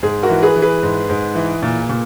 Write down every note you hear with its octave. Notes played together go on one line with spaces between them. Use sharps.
G#2 G#4
F#4 A#4
E3
G#4 B4
E3
G#4 B4
G#2
G#2
E3
A#2
A#2